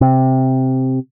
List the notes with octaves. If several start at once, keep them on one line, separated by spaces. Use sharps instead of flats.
C3